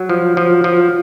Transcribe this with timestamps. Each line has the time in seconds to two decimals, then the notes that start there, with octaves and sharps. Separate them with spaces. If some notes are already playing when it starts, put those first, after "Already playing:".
Already playing: F#3
0.09 F3
0.37 F3
0.64 F3